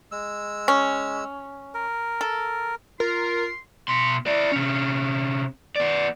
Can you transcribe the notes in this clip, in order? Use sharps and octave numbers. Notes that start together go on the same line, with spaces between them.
G#3 E6
C#4
A#4
A4
F4 A#4 C6
B2 C6
E4 D5
C3 C#4
B3 D5